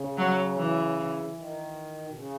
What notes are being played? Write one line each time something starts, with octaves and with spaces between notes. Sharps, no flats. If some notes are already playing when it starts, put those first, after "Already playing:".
Already playing: C#3
F#3
E3
E3
D#3
B2
C#3